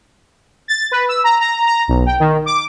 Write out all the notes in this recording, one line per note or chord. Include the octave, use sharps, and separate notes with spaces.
A6
B4
E6
A#5
A#5
A#5
B1
G5
D#3
D6